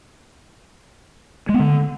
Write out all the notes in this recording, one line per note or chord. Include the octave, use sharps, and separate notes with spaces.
G#3
B3
D3